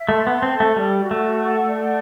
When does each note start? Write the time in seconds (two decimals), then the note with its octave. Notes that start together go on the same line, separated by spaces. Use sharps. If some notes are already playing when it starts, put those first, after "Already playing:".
Already playing: E5
0.09 A3 C6
0.27 B3 A5
0.42 C4
0.54 A4
0.60 A3
0.76 G3 D5
1.00 F#4
1.11 A3
1.22 A4
1.45 F#5
1.67 D5